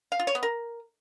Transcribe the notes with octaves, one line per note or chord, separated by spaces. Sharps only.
F5
F4
C#5
B3
A#4